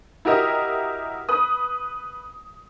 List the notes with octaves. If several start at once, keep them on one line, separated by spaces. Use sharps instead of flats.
E4 F#4 G4 A#4 D#5
B4 D#6